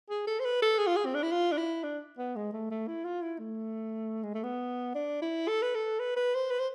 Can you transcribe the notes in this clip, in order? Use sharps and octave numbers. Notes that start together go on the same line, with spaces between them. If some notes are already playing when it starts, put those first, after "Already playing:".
G#4
A4
C5
B4
A4
G#4
F4
G#4
C4
D4
E4
F4
D4
E4
D4
B3
G#3
A3
A3
E4
F4
E4
A3
G#3
A3
B3
D4
E4
A4
B4
A4
B4
B4
C5
B4
C5